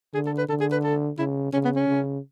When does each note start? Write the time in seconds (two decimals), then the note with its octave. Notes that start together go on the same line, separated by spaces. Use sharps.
0.14 D3 G#4
0.26 A4
0.38 B4
0.49 D3 A4
0.61 G#4
0.72 B4
0.84 A4
1.18 C#3 E4
1.53 C#3 C#4
1.65 B3
1.76 C#4
1.88 C#3